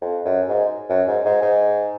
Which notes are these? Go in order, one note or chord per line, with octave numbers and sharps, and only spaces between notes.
F2
F#2
G#2
F#2
G#2
G#2
G#2